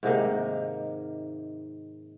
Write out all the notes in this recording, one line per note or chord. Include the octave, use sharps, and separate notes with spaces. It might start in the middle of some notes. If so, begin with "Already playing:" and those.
G#2 C3 D#3 A#3